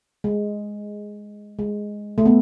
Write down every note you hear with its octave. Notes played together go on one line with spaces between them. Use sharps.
G#3
G#3
A3
B3